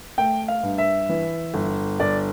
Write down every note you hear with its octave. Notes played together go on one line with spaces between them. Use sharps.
A3 G5
F5
G2
E5
E3
G1
G1 D5